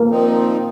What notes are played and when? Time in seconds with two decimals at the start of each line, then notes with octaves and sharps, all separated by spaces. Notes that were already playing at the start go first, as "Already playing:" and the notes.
Already playing: A#3
0.10 A#2 F3 C4 D#4